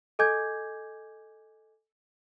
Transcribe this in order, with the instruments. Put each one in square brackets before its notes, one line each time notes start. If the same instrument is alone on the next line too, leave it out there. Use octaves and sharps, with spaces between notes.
[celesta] A4 D#5 G#5 D6 G6 G#6